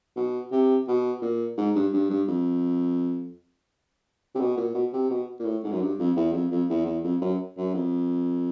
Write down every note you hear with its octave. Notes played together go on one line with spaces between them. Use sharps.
B2
C3
B2
A#2
G#2
G2
G2
G2
F2
C3
B2
A#2
B2
C3
B2
A#2
A2
G#2
F#2
G2
F2
E2
F2
F2
E2
E2
F2
F#2
F#2
F2